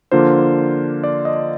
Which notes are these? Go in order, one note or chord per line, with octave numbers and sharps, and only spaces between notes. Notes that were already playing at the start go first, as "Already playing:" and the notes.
D3 F3 A#3 D4 F4 C5
D5
D#5